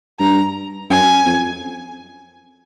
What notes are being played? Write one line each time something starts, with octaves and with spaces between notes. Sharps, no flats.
G2 A#5
F#2 G#5
F2